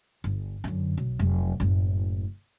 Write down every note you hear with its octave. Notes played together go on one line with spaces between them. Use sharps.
G1
F#2 D3
B1
F1 F#3
F#1 A2